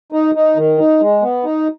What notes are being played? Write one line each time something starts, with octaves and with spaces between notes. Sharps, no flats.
D#4
D#4
D#3
D#4
G#3
B3
D#4